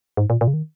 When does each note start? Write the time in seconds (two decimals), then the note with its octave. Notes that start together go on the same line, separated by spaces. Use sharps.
0.17 G#2
0.30 A#2
0.41 A#2
0.48 C#3
0.54 D#3